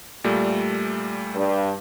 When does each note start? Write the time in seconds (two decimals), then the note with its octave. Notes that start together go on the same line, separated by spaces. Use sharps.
0.24 A#2 G3 A3
1.36 G2